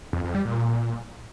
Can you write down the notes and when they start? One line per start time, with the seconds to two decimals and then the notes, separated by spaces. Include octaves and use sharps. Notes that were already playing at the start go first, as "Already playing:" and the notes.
0.13 F2
0.24 F2
0.35 G3
0.45 A#2